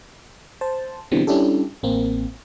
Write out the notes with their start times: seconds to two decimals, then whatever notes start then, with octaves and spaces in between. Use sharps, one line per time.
0.61 C5 A5
1.11 B2 D3 E3 G3 B3 C4
1.27 G3 C#4 D4 E4 G4 A4
1.83 A1 A#3 C4